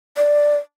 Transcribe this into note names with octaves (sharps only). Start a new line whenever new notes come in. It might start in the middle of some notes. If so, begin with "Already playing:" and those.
D5